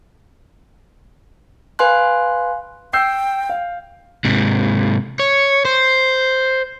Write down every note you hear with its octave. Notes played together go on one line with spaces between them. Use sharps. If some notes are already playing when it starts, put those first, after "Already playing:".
B4 F5 G#5 C6 F#6
G5 E6 G6 C7
F5
G#2 C3
C#5
C5